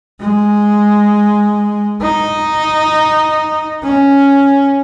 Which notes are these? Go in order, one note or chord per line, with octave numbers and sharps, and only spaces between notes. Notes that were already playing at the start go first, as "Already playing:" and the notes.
G#3
D#4
C#4